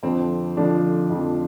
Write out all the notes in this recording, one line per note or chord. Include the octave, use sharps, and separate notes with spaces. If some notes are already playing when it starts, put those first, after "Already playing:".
F2 D3 F3 C4
F2 D3 F3 D4
F2 D3 F3